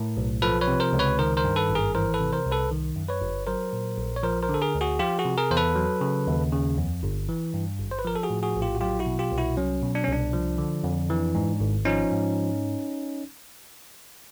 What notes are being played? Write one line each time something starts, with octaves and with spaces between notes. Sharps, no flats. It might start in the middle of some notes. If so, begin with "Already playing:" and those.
Already playing: A2 A#4
B1
F3 A4 B4
B4 C#5
C3
A#4 C5
C#2
B4 C#5
D#3 A#4 C5
A#4 C5
G2
A4 B4
G#1
G#4 A#4
E3 A#4 C5
A4 B4
C3
A#4 C5
C2
A4 B4
D#3
F#2
B4 C#5
G1
F#3 A#4 C5
A#2
A#1
C#5
F3 A#4 C5
A#4 C5
D3 A4
G#4 A#4
D2
F#4 G#4
F3 F4 G4
F#4 G#4
C3
G#4 A#4
E2 C5
A4 B4
F#3
C#3
D#2
C#3
F2
G1
E3
G2
G#1
C5
B4
F3 A#4
A4
F#4 G#4
A2
F#4 G#4
A#1
F4 G4
F#4
F#3 F4 G4
E4 F#4
B2
F4 G4
C2
E4 F#4
F#3 C#4
B2
D4
C#4
C2 D4
F3
D3
F2
E3
G#2
G#1
F3 C#4 D#4
G#2